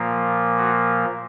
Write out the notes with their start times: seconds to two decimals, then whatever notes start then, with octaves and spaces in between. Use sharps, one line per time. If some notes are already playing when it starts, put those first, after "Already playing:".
Already playing: A#2 F3 A#3
0.58 F#4